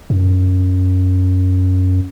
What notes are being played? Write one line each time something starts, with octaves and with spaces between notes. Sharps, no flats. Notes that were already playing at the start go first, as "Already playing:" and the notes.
F#2